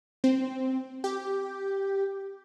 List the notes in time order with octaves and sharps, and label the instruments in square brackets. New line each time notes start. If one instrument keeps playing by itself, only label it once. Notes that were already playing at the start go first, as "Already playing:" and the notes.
[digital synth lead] C4
G4